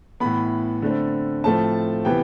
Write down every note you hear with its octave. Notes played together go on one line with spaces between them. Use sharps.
A2 E3 B3 B5
D3 A3 C4
A2 F3 A3 C4 A5
C3 E3 B3 G5